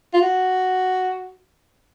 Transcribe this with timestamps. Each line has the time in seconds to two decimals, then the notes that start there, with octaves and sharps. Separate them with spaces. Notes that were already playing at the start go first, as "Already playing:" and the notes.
0.13 F4
0.22 F#4